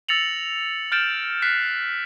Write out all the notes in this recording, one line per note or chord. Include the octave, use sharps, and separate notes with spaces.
E6 A6 A#6 C#7 F7 F#7
F6 G6 A6 D7 E7 F#7
F#6 G6 B6 C7